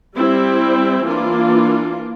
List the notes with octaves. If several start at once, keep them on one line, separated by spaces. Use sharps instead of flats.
G3 C4 E4
E3 A#3 D4 F4